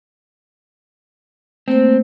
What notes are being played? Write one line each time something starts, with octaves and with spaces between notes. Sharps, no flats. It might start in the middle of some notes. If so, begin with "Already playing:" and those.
A3 A#3 C4 C5